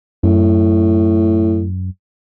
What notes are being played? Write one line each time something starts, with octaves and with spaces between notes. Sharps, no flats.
F#2 A2